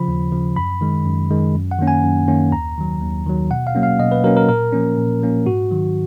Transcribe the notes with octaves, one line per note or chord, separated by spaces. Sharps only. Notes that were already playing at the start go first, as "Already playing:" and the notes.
Already playing: C#3 F3 B5
D#2
C#3 F3
F#2 B5
D#3 G#3
F#2
D#3 G#3
F#2
F#5
D#3 A#3 C#4
G#5
F#2
D#3 A#3 C#4
D#2 A#5
D#3 F#3
D#2
D#3 F#3
B2 F#5
F5
F#3 A#3 C#4
F5
B2 D#5
B4
F#3 A#3 C#4 A#4
A#4
A#2 A#4
F3 A#3 C#4
A#2
F3 A#3 C#4
G#2 F#4
D#3 F#3